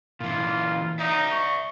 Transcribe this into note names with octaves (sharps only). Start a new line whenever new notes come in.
A#2 E3 F4
D#4 D5 E5
C#6